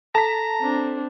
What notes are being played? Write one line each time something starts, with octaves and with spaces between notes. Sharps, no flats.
A4 A5 A#5 B6
C4 D4